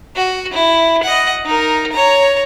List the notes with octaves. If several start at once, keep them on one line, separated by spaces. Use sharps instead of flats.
F#4
E4
D#5 F#5
D#4 A#4
C#5 A#5